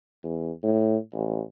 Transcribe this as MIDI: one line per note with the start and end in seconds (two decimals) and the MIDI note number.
0.23 0.51 40
0.63 0.97 45
1.13 1.40 33